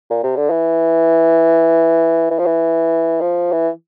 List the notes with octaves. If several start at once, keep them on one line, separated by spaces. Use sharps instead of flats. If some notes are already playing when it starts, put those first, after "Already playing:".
A#2
C3
D3
E3
E3
F3
E3
F3
E3